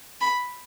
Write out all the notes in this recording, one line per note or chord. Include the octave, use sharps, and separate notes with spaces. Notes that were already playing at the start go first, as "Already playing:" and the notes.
B5